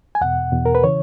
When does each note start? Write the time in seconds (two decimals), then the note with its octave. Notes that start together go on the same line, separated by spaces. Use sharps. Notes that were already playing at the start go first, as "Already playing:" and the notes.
0.15 G#5
0.21 E2 B2 F#5
0.52 E2 B2
0.66 A#4
0.75 B4
0.84 C#3 E3 C#5